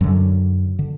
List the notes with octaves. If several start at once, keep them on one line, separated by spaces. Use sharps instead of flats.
F#2 D3 F#3
D3